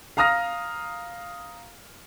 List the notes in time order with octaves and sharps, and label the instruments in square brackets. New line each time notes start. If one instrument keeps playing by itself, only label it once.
[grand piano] F5 A#5 D#6 F6 A#6